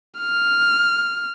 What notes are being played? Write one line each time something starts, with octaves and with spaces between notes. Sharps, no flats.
F6